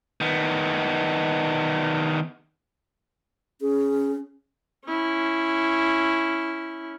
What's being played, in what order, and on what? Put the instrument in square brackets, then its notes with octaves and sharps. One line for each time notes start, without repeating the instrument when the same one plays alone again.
[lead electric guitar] D#3 B3
[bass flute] C#4 [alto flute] G#4
[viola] C#4 E4